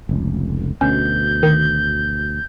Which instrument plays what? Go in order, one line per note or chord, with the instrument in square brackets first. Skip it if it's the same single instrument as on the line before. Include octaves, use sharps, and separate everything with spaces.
[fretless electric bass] F1 C#2
[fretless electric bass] D2 B2 [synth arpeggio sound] C#4 [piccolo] G6
[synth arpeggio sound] D#3